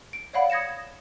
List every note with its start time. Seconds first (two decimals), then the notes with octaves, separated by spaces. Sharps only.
0.13 D7
0.33 C#5 D5 F5 F#5 B5
0.50 D#6 G#6 A#6 C#7 E7